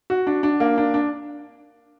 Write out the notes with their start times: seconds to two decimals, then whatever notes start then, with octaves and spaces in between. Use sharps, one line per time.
0.10 F#4
0.27 D4
0.43 D4
0.60 A#3
0.78 D4
0.94 D4